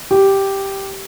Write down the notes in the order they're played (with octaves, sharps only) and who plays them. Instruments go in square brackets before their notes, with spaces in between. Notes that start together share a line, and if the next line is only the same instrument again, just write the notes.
[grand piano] G4